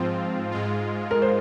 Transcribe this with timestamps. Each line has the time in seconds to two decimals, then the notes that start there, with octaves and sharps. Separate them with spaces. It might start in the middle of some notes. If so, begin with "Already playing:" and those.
Already playing: G#2 F3 C4 F4
0.51 G#2 G#3 F4
1.11 A#4
1.22 C5